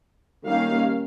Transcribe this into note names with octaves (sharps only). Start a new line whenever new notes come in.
D#3 G3 A#3 C#4 F5